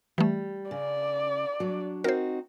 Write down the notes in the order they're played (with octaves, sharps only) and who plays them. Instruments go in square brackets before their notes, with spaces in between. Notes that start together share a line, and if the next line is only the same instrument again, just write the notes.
[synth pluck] E3 A3 [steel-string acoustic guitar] G3
[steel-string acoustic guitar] C#3 [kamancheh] D5
[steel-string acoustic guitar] F#3 D4
[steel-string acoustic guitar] C4 D#4 F#4 [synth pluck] A#4 C5